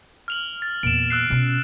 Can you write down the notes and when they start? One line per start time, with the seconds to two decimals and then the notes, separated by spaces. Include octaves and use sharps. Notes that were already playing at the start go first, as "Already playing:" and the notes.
0.28 F6 F7 F#7
0.62 A6
0.83 E2 A#2 D7 E7
1.10 E6 F#6 C7
1.30 B2 C#4